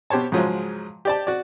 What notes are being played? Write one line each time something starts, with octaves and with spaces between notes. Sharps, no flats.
B2 G4 C5 C#5 A5
G#2 C#3 F3 F#3 G#3
G4 D5 A5
F#4 D5